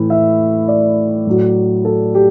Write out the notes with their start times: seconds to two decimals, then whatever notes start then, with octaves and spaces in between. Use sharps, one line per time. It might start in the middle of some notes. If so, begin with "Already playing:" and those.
Already playing: A2 E3
0.10 E5
0.68 D5
1.27 A2 F#3
1.85 A4
2.15 G4